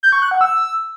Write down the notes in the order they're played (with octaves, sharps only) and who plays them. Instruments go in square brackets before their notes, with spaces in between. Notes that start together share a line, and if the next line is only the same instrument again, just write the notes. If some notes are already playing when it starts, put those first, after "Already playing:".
[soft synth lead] G6
C#6
F#6
F#5
E6